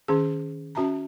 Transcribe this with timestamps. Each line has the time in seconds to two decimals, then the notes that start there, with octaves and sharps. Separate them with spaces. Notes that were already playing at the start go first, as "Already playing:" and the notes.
0.08 D#3 C#4 G#4
0.75 C#4 F#4 E5 A5 A#5